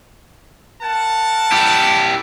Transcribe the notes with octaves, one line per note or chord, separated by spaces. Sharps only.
A#4 F#5 A5
E4 G4